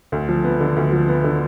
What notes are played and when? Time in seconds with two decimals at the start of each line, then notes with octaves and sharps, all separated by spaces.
0.12 D2
0.29 F3
0.44 B3
0.60 D3
0.76 D2
0.92 F3
1.08 B3
1.24 D3